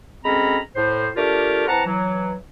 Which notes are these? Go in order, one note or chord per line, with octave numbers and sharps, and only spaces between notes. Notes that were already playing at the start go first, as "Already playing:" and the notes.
D2 G#3 C4 C#4 A#5 B5
A2 C5
A3 D4 F4 G4 A#4
E3 C4 F#5 A5 A#5
E3 F#3